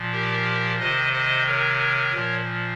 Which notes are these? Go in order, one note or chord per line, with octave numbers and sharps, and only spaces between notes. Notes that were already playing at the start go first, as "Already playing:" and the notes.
Already playing: A#2 F3
G4 A#4
C3 D#3 C5 D#5
C5 D#5
A#4 C#5
A#2 F3